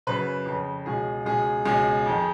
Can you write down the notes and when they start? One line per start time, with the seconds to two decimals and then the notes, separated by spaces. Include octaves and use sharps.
0.07 F#2 C#3 B4
0.46 F2 C#3
0.86 C#2 B2 G#4
1.26 C#2 B2 G#4
1.65 C#2 B2 G#4
2.06 F2 D#3